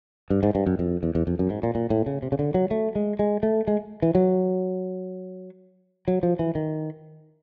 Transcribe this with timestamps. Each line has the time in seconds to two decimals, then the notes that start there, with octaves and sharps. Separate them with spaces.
0.30 G2
0.43 G#2
0.55 G2
0.66 F#2
0.79 F2
1.03 E2
1.15 E2
1.27 F2
1.39 F#2
1.50 G#2
1.63 A#2
1.75 A#2
1.90 A2
2.06 C#3
2.22 C3
2.32 C#3
2.39 D3
2.54 F#3
2.71 A3
2.95 G#3
3.19 G#3
3.43 A3
3.67 G#3
4.02 E3
4.15 F#3
6.08 F#3
6.23 F3
6.39 E3
6.55 D#3